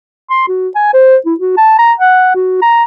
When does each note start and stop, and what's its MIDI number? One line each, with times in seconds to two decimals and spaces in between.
0.30 0.48 84
0.49 0.69 66
0.75 0.90 80
0.94 1.16 72
1.26 1.34 64
1.40 1.57 66
1.57 1.79 81
1.79 1.93 82
2.00 2.31 78
2.35 2.59 66
2.62 2.84 82